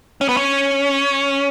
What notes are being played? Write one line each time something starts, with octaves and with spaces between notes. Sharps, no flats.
C#4
B3
C#4